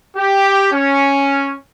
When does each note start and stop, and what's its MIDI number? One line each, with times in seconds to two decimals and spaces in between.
0.17 0.71 67
0.72 1.54 61